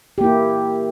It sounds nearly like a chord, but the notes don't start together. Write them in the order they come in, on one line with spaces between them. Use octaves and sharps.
G4 A#3 E4